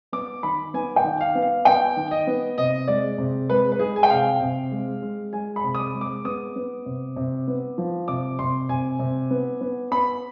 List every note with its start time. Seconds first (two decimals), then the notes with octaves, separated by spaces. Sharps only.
0.12 B3 D6
0.43 D#3 B5
0.74 B3 G#5
0.96 G5
1.04 D#3
1.21 F5
1.35 B3
1.42 F5
1.65 B3 G5
1.96 D#3
2.11 D#5
2.27 B3
2.58 C3 D#5
2.88 G#3 D5
3.18 C3
3.50 G#3 B4
3.72 B4
3.80 G#3 G#4
3.96 G#5
4.03 G5
4.10 C3 F5
4.41 C3
4.72 G#3
5.02 G#3
5.33 G#3 G#5
5.56 B5
5.64 C3
5.74 D#6
5.79 D6
5.94 G#3
6.01 D6
6.25 B3 D#6
6.56 B3
6.86 C3
7.16 C3
7.48 B3
7.78 F3
8.08 C3 D6
8.39 C3 C6
8.69 C3 G#5
8.99 C3
9.31 B3
9.61 B3
9.91 B3 B5